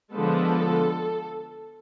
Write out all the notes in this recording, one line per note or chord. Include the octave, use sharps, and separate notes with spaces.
D3 F3 G#3 B3 A4